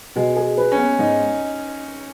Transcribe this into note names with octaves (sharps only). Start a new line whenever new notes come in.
B2 G#3
G#4
B4
C#4
B3
G#2 D#4